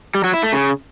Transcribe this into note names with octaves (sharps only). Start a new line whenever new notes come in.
G3
F#3
E4
A3
C#3